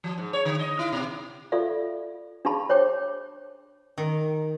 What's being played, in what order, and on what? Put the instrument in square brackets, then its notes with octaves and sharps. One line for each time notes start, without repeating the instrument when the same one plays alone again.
[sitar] F3
G#2
C#5
D3
D#5
E4
B2
[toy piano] F4 A4 D5 E5 F5
D4 G4 G#4 F5 A5 B5
C5 C#5 G5 D6
[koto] D#3